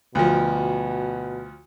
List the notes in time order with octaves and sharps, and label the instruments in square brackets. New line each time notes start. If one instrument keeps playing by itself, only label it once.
[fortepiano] D2 F3 [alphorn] B2